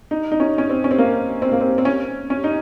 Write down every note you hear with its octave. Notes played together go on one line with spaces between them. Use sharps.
D#4
D#4
C#4
C#4
C4
C#4
C4
A#3
C4
A#3
C4
C4
C#4
C#4
D#4